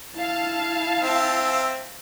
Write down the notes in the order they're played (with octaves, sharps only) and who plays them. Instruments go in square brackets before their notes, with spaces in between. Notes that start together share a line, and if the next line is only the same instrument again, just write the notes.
[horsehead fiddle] E4 [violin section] F5 A5
[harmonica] C4 E5